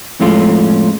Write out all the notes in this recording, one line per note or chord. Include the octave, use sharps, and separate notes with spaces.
F2 A2 G#3 A3 C#4 F4